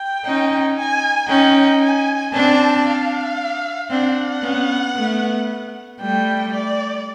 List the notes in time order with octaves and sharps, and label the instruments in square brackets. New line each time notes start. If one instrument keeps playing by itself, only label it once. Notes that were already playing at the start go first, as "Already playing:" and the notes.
Already playing: [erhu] G5
[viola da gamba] C#4 D#4
[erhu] G#5
[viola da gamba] C#4 D#4 [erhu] G5
[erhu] G#5
[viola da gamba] C4 D4 [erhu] A5
[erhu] F5
[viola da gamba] C4 D4 [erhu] F#5
[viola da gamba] B3 C#4
A3 B3
[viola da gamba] G3 A3 [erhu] G5
[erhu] D5